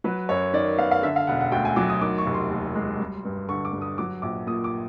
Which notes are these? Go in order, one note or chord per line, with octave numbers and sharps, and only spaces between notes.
F#3 B4
F#2 C#5
D#3 D5
B3 F5
F5
D3 E5
F5
E1 F#5
F#5
D2 G5
G#5
F#3 D6
D#6
D#3 D6
C#6
F1
C6
D#2
G#3
G3
G2
D3 C#6
D6
G2
D#6
F#3 D6
A#1 D6
A#2 D#6
D6